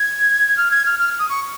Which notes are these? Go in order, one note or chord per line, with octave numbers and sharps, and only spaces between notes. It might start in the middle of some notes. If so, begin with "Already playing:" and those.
Already playing: G#6
F6
G#6
F6
F6
D#6
C#6